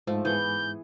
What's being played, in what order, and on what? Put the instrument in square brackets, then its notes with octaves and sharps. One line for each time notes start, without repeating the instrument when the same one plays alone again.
[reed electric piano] G#2 [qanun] F3 A3
[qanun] E3 B3 G#4 [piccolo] G6